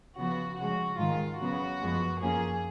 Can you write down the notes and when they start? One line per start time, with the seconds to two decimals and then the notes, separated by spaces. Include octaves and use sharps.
0.18 C#3 F3 B3 F#4
0.59 C#3 F3 G#3 F#4
0.99 G#2 D#3 G#3 F4
1.40 C#3 F#3 B3 F#4
1.80 F#2 F3 G#3 B3
2.21 F#2 F3 A#3 C#4 G#4